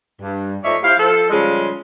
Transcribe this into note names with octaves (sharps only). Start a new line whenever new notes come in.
G2
F3 A3 D#4 C#5 D5 E5
E4 G4 C5 F5
F3 A4
C#3 F3 G3 G#3